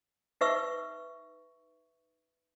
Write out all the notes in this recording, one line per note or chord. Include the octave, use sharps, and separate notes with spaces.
D#4 B4 E5 C#6 E6